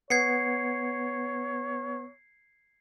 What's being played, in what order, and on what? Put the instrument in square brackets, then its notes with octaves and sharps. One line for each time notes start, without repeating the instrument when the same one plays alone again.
[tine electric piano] B3 [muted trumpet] C#5 [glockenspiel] G#6 C7 C#7